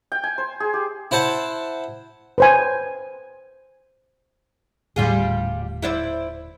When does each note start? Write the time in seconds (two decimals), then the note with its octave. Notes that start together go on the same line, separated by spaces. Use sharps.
0.12 G5
0.24 G#5
0.38 C5
0.60 G#4
0.74 G4
1.11 E4 C5 F#5 A5
2.38 B4 C5 G#5
4.96 D#1 A2 D3 G3 F4 G#4
5.82 E4 C5 D5